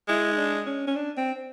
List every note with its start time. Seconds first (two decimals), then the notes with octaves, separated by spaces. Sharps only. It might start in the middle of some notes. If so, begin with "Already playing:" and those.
0.08 G#3 E4
0.32 D#4
0.38 D4
0.67 C#4
0.88 C#4
0.96 D4
1.17 C4